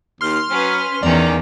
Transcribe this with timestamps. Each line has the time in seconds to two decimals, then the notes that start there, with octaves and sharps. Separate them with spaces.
0.21 D#2 C6 F6
0.50 F#3 C#4 B4
1.03 E2 D#3 C#4 D5 A#5